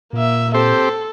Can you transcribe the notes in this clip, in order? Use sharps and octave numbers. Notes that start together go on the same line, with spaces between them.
A#2 A#3 E5
C4 G4 A4 C5